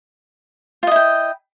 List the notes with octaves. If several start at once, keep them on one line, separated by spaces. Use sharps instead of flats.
E4 F4 D#5 G5